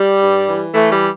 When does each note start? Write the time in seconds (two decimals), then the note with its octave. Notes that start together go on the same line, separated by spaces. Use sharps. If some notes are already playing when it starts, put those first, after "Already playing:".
Already playing: G3
0.21 G2
0.47 E3
0.74 E3 A3
0.92 G3